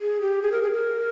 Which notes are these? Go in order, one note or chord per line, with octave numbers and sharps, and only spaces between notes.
G#4
G4
G#4
A#4
G#4
A#4